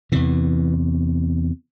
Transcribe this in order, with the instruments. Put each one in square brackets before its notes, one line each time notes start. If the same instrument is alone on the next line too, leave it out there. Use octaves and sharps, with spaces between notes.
[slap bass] E2 C3 E3